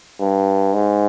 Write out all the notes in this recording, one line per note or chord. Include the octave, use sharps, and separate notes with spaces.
G2
G#2